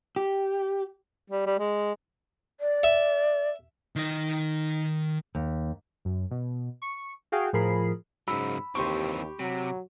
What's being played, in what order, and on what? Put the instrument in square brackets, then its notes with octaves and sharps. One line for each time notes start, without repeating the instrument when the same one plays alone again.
[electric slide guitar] G4
[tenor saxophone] G3
G3
G#3
[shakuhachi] D5
[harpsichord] E5
[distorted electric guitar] D#3 D#5
[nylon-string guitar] D#2
[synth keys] F#2
B2
C#6 C#7
F#4 G#4 F5 G5
A2 F3 G#4 A#4 B5 C7
[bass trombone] G#2 [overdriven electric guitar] C#3 F#3 [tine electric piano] B5 [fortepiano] E6
[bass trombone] D#2 [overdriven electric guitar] E3 C4 [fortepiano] G4 C6 C#6
[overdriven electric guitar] C3 [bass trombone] F#3